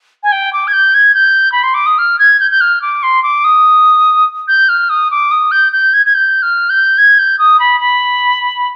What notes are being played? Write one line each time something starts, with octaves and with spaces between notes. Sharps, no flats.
G#5
G5
D6
G#6
G6
G#6
G6
B5
C6
D6
D#6
F6
G#6
G6
G6
F6
D6
C6
D6
D#6
G6
F6
D#6
D6
D#6
G6
G6
G#6
G#6
G6
F6
G6
G#6
G6
D#6
B5
B5